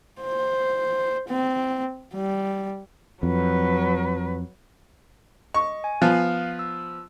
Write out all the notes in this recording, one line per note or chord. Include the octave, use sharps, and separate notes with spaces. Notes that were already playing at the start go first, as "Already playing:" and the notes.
C5
C4
G3
F2 F#3 B4
D#5 C#6
G#5
F3 B3 F5 F6
E6